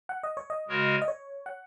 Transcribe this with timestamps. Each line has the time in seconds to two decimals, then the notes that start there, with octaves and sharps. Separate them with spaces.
0.09 F#5
0.23 D#5
0.37 C#5
0.50 D#5
0.68 C#3 G#3 F#4 A#4 C#5
1.02 D#5
1.08 C#5
1.46 F#5